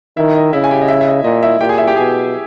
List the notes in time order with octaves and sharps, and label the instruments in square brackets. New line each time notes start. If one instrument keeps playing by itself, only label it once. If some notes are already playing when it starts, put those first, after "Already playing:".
[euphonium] D#3 [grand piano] E4 E5
[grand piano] D#5
[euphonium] C#3 [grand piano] E4 E5
[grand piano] G#5
G4 G5
D#5
E4 E5
E5
D#5
[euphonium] A#2 [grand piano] D#5
[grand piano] E4 E5
[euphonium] A#2 [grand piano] G4 G5
[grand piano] G#4 G#5
E4 E5
G4 G5
[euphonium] B2 [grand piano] G#4 G#5